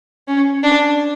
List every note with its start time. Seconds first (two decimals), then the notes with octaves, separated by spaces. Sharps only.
0.28 C#4
0.63 D4